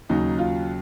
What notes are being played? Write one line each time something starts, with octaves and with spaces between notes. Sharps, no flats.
D#2 C#3 F#3 D#4
F4